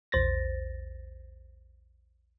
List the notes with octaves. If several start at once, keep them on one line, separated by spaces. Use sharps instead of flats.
A#1 E2 C5 A6 A#6